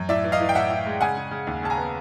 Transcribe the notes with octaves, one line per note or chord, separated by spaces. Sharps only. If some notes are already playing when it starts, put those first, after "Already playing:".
Already playing: F#2
A2 D5 E5
E3
D#5 F5
E3
G5
A2 E5 F#5
A2
G#3
C#3 F#5 G#5
C#3
C#3
D#2
C#3 A5
G#5 A#5
B3